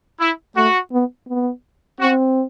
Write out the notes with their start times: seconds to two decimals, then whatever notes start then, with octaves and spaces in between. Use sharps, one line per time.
0.20 E4
0.56 A3 F#4
0.92 B3
1.29 B3
2.00 C4 F#4